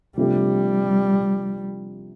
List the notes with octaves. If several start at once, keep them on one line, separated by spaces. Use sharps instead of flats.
C3 F3 G3 A3 D4 G4